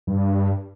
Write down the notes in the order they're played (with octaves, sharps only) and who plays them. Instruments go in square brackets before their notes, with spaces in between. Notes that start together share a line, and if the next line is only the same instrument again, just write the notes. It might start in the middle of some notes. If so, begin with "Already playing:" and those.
[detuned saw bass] G2